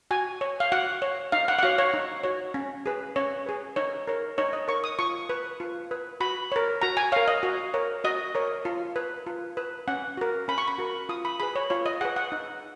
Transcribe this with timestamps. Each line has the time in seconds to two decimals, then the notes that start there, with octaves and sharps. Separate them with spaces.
0.11 F#4 G#5
0.41 C#5
0.60 F5
0.72 F#4 F#5
1.02 C#5
1.32 D#4 F5
1.48 F#5
1.59 F#5
1.63 F#4 C#5 F5
1.78 C#5
1.94 D#4
2.24 F#4 C#5
2.54 C#4
2.86 G#4 B4
3.16 C#4 C#5
3.46 G#4 B4
3.76 D#4 C#5
4.07 A#4 C#5
4.38 D#4 C#5
4.53 D#5
4.68 A#4 C#5 C#6
4.84 D#6
4.99 F4 C#6
5.29 B4
5.60 F4
5.91 B4
6.20 F#4 B5
6.52 A#4 C#5
6.82 F#4 A#5
6.97 G#5
7.12 A#4 C#5 F5
7.28 D#5
7.43 F#4
7.74 A#4 C#5
8.04 F#4 D#5
8.35 A#4 C#5
8.65 F4
8.96 B4
9.27 F4
9.57 B4
9.88 C#4 F#5
10.17 F#4 A#4
10.48 C#4 B5
10.58 C#6
10.68 B5
10.78 F#4 A#4
11.09 F4 D#6
11.25 B5
11.40 G#4 B4 B5
11.56 C#5
11.70 F4 C#5
11.86 D#5
12.01 G#4 B4 F#5
12.16 F#5
12.32 D#4